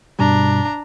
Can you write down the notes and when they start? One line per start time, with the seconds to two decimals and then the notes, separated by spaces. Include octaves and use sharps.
0.19 G2 B2 G3 D4 A#5